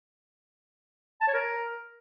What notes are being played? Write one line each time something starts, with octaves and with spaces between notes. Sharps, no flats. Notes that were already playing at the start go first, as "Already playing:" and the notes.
A5
C#5
A#4